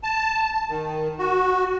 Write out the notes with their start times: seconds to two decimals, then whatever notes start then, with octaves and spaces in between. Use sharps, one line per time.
0.03 A5
0.70 D#3
1.19 F#4